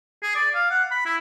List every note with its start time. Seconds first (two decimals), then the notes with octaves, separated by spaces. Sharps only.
0.23 G#4
0.35 D5
0.55 F5
0.70 F#5
0.91 B5
1.06 E4